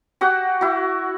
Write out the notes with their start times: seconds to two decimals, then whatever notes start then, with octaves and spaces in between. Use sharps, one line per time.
0.21 F#4 G4 F#5
0.61 E4 F#4